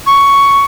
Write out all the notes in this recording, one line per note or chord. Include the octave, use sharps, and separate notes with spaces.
C#6